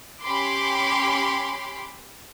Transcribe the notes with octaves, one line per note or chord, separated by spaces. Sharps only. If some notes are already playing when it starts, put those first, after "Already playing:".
C#4 G4 B5 C6 D6